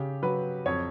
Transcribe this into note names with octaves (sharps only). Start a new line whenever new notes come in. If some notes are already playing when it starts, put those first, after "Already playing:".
Already playing: C#3 G4
F#3 B4
F2 C#5